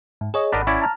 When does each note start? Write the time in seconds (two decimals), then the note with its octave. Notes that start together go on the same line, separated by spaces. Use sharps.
0.21 G#2
0.34 G#4 C#5 D#5
0.52 G#1 D4 A#4 D#5 F#5 B5
0.67 C#4 E4 D5
0.81 A5 A#5 F6